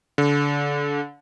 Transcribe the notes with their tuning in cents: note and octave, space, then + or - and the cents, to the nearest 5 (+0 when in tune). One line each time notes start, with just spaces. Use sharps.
D3 -30